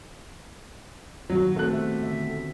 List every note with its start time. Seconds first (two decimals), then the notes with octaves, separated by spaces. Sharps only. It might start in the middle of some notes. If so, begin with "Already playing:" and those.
1.30 A#2 D#3 F#3 F#4
1.56 F3 A3 C4 A4 F#6
1.70 B3 G4 E5
2.02 D3 E5